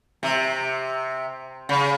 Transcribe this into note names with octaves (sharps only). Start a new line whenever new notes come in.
C3
C#3